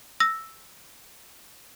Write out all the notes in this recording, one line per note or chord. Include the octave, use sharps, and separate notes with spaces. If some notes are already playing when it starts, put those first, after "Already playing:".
E6 A#6